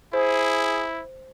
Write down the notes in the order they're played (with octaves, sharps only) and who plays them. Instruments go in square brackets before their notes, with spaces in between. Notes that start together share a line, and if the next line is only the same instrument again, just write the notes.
[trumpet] E4 [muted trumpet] G#4 [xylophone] C5